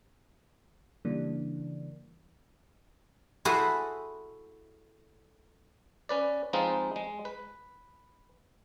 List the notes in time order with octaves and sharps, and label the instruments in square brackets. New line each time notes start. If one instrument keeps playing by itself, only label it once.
[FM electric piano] C#3 E3 G3 A#3 D4
[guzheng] E4 F#4 G#4 A4 B4 C5
[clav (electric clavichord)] C#4 B4 D5
F3 G#3 C4 D#4 F4 B4
G#3
B4